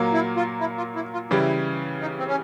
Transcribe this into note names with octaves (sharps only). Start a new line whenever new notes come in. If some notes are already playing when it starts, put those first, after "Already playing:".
Already playing: A#2 F#3 A#3
E4
F4
E4
F4
E4
F4
C#3 E3 G3 E4
D#4
C4
C#4